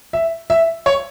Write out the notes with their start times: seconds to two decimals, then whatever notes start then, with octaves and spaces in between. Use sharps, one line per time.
0.13 E5
0.50 E5
0.86 C#5